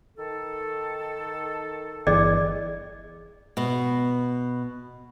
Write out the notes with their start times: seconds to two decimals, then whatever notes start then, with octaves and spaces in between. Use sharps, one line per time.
0.17 D#3 A4
2.07 G1 E3 G#4 D5 D#5
3.57 B2 B3